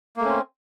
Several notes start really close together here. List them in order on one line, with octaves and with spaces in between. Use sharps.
A#3 A3 C#4 C4